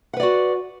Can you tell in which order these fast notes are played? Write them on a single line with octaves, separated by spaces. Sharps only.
F#5 B4 D5 F#4